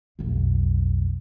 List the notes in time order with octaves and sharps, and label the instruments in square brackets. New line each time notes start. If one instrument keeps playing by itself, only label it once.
[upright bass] B1 F2